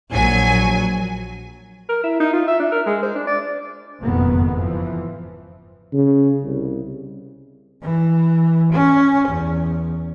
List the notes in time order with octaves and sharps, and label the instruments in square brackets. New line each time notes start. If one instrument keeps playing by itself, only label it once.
[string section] A#1 F#3 G#5
[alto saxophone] A#4
E4
D#4
F4
E5
D4
A#4
G#3
C5
D4
D5
[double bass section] F#1 F2 G#2 B2 D#3 B3
E3 F3
[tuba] C#3
C2
[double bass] E3
C#4
E2